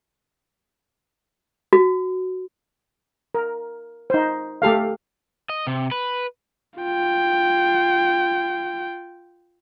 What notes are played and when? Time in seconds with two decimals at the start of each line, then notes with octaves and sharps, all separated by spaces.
1.73 F#4
3.34 A#4
4.10 D#4 C5
4.62 A3 G4 A4 F5
5.49 D#5
5.67 C3
5.91 B4
6.80 F4 G5